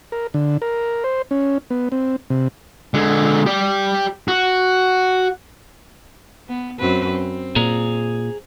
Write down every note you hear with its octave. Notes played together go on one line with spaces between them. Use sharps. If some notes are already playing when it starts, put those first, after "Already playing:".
A#4
D3
A#4
C5
C#4
B3
C4
C3
D3 G#3
G4 D5
F#4
B3
F#2 C4 B4
C4
A#2 G#4 A#5